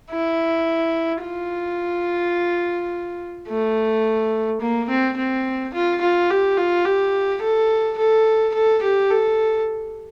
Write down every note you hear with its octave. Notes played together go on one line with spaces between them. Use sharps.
E4
F4
A3
A#3
C4
C4
F4
F4
G4
F4
G4
A4
A4
A4
G4
A4